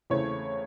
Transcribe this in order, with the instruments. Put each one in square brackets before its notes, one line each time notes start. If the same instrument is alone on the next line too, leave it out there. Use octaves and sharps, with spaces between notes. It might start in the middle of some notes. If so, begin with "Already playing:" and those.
[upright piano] E2 C#3 E3 A3 C4 C#5